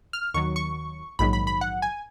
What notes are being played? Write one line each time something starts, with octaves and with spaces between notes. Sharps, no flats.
F6
D#2 D#3 F#3 C#6
C#6
A#1 G#2 D#3 F#3 B5
B5
B5
F#5
G#5